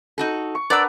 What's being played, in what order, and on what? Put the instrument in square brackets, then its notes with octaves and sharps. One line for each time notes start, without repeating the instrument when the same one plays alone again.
[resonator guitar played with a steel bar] D#4 F#4 A4
[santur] C#6
[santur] D4 B4 F#5 [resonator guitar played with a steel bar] A#4 [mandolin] D5 E6